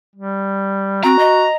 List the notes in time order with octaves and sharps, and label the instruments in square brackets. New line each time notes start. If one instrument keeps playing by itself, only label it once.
[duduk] G3
[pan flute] C4 [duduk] F#4 [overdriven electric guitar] A#5
[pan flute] D#5